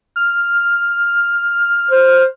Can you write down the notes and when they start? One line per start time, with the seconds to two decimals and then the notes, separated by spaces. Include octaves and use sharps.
0.16 F6
1.91 C5